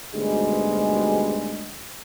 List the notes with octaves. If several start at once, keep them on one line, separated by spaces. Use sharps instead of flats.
D2 G#2 B2 G3 G#3